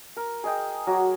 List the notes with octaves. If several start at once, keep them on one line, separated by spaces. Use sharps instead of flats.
A#4
G#4 D#5 G5
F#3 F#4 D6